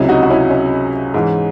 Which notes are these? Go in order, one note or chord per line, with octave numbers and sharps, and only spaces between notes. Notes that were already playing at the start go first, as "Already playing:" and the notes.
Already playing: C#2 C3 F#3 C#4 E4
D#4 F#4
F#4
C#4 E4
C#4
G#2 E3